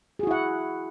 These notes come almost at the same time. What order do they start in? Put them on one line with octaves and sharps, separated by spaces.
G#4 F#4 E4 F#5